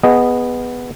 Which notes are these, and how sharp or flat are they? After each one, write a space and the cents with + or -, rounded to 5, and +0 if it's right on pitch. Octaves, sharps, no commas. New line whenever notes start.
B3 +0 G#4 -20 D#5 +0